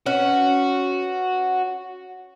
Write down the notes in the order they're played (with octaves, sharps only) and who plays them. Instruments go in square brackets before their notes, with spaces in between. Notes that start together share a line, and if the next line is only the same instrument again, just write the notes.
[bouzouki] C#4 B4 [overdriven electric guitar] F#4